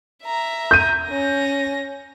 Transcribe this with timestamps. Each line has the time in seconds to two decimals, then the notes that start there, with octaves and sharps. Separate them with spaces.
0.24 E5 A#5
0.71 G6 D#7
1.09 C#4 A#6